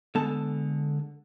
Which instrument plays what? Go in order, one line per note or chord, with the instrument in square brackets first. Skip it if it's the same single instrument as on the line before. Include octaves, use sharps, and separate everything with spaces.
[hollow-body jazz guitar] D3 G#3 B3 A4 A5